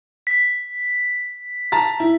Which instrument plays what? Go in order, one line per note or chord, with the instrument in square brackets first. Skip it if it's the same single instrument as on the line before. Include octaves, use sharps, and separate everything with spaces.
[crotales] B6
[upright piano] A5 A#5 A6
E4